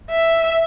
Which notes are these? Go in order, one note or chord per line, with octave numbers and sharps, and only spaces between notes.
E5